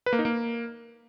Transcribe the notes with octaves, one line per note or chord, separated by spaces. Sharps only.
B4
A#3
D#4
A#3